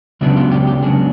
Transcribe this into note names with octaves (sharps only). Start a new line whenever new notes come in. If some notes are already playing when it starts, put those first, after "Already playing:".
C#2 C#3 F#3 B3 D4 E4
F4
G4
G4
C#2 C#3 F#3 B3 D4 G#4